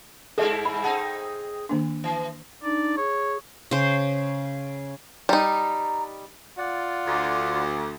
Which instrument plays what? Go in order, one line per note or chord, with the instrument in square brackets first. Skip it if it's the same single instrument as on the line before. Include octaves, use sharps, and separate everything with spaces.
[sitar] G2 G#3 E4 [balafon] G#4 [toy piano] A4 E5
[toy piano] B5
[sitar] C4 D#4 G#4 [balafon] F#5 A5
[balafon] D#3 A#3 D4
[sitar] E3
[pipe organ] D4 D#4 [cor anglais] D5
[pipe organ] G#4 [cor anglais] C#5
[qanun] C#3 C5
[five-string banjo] G3 D#4 [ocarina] A#5
[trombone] F4 [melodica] D5 F#5
[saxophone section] D2 [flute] D6